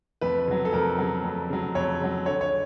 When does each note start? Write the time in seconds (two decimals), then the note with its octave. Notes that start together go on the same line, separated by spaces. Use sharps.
0.21 F2 B4
0.48 C#3 F#3
0.65 A4
0.73 F2 A#4
0.98 C#3 F#3
1.24 F2
1.50 C#3 F#3
1.75 F2 C#5
2.00 C#3 F#3
2.26 D3 C#5
2.41 C#5